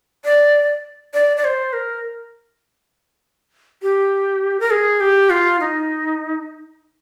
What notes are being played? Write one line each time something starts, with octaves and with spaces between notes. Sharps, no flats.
D5
D5
D5
C5
A#4
G4
A#4
G#4
G4
F4
D#4